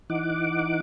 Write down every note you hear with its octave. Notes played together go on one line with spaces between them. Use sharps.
E3 D#4 F#5 D6